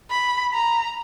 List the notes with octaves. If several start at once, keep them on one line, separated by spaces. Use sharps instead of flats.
B5
A#5